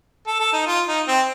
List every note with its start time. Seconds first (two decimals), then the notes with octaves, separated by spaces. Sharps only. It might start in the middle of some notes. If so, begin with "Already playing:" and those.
0.27 A4
0.40 A4
0.53 D#4
0.66 F4
0.87 D#4
1.08 C4